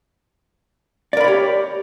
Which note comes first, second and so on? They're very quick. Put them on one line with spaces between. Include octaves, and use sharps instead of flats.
D5 A#4 B5 C#5 G4